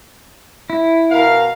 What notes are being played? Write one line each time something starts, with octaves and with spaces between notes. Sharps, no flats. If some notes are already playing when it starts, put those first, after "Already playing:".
E4
B2 A#4 F5